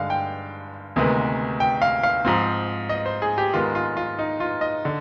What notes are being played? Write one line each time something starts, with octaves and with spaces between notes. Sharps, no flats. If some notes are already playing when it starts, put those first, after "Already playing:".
Already playing: G2 D3 G#3 F5
G5
D2 C3 D#3 G#3 B3
G5
F5
F5
G#2 F3 C4
D#5
C5
G#4
G4
G#2 D#3 G#3 B3 F4
F4
F4
D#4
F4
D#5
D3